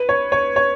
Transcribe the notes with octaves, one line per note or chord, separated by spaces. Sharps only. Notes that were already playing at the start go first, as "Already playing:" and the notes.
Already playing: B4
C#5
C#5
C#5